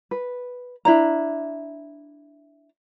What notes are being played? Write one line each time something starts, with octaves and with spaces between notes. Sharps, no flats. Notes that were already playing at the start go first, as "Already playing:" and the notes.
B4
D4 E4 C#5 A#5